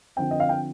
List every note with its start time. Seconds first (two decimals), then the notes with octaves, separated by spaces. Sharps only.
0.16 D3 F3 C4 G5
0.31 D#5
0.40 F5
0.49 G5